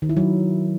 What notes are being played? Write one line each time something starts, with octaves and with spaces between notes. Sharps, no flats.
D#3
E4
F#3